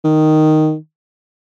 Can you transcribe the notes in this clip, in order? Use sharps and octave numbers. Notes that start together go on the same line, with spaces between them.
D#3